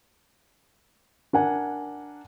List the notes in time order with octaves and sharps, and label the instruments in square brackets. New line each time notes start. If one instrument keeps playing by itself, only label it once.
[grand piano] D4 A#4 F#5 G#5